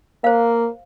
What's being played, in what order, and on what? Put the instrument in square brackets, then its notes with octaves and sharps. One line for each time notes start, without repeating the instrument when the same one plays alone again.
[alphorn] A#3 [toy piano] C5 F5